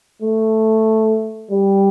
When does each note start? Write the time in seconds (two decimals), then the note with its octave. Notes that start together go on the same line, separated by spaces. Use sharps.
0.22 A3
1.51 G3